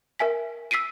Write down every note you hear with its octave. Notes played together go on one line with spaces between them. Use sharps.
A#4 E5 G#5 B6
E6 B6 C7 D7 D#7